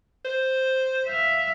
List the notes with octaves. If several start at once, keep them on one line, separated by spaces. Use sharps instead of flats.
C5
E5 F5